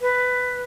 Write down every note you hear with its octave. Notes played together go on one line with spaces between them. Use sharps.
B4